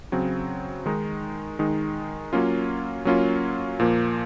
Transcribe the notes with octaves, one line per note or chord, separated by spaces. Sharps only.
C#3 F#3 C4
D#3 G#3 D#4
D#3 G#3 D#4
F#3 A#3 C#4 F4
F#3 A#3 C#4 F4
A#2 F3 A#3